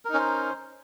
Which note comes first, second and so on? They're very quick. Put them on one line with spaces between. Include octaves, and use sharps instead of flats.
A#4 D#4 C#4 C5